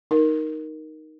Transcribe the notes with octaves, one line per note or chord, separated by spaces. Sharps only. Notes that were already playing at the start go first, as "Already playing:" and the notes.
D#4 A#4